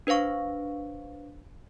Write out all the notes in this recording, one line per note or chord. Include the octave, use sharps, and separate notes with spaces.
D4 B4 C5 F5 C#6